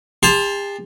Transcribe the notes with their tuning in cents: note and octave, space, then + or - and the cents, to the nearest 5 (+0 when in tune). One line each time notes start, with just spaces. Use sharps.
G4 +45 A5 -10 C6 +0